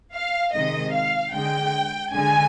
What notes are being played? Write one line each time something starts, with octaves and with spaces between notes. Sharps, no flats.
F5
C3 D#3 G#3 D#5
F5
D3 G#3 G5
D3 G#3 G#5